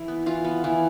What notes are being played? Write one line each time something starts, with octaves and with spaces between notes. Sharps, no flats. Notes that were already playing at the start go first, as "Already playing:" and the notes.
Already playing: E3 E4
B3
E3 F4
B3
E3